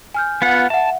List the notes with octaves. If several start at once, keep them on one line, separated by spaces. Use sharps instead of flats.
G#5 F6 G6
B3 F4 F#5
E5 F#5 A5